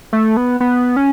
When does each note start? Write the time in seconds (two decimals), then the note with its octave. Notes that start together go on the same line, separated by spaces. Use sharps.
0.13 A3
0.37 B3
0.60 B3
0.96 C#4